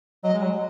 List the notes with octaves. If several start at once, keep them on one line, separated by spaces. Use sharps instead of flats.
F#3 D#5
G#3
F#3